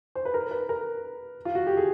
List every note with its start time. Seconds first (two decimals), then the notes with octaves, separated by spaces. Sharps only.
0.15 C5
0.25 B4
0.34 A#4
0.51 B4
0.69 A#4
1.45 F4
1.55 F#4
1.67 G4
1.77 G#4